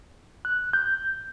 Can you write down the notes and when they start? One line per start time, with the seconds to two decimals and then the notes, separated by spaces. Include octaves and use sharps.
0.45 F#6
0.73 G6